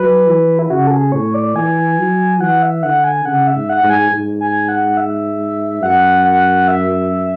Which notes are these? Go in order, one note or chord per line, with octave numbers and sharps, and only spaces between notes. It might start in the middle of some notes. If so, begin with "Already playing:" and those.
Already playing: F#3 B4
E3
E4
C#3 F#4
A4
G#4
A2 C#5
D5
E3 G#5
F#3
E3 F#5
E5
D3 F#5
G#5
C#3 F#5
E5
G#2
F#5
G#2
G#5
G#2
G#5
F#5
E5
F#2 F#5
F#5
E5